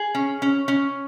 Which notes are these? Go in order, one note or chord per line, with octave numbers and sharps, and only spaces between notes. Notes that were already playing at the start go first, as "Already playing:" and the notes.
Already playing: G#4
C#4
C#4
C#4